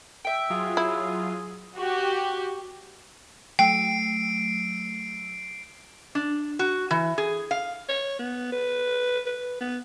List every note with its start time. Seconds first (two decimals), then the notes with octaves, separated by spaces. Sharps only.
0.25 E5 G5
0.50 F#3 F4 G#4
0.77 E4
1.77 F#4 G4
3.59 F#3 A3 G5 E6 C7 D7
6.15 D4
6.59 F#4
6.91 E3
7.18 G#4
7.51 F5
7.89 C#5
8.19 B3
8.52 B4
9.26 B4
9.61 B3